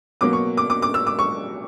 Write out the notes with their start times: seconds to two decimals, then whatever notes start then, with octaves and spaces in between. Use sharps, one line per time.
0.21 B2 F#3 A#3 D6
0.33 C#6
0.57 D6
0.70 D6
0.82 D6
0.94 E6
1.07 D6
1.19 C#6